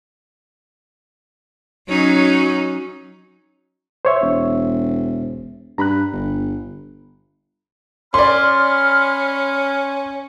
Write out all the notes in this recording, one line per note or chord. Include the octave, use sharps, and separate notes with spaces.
F#3 C#4 D#4
C5 C#5 E5
E1
G2 A#5 B5 F#6
G1
C#4 D5 B5 C6 F6